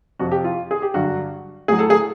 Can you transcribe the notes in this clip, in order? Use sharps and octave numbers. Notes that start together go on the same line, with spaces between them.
F2 C3 F3 F#4
G4
F4
G#4
G4
G2 D3 F#3 F#4
A2 F#3 G#4
A4
G#4